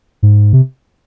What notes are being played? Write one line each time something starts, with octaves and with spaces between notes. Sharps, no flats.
G#2
C3